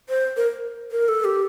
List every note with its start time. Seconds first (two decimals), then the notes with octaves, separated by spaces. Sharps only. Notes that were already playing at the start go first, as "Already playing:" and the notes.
0.09 C5
0.37 A#4
0.92 A#4
1.08 A4
1.25 G4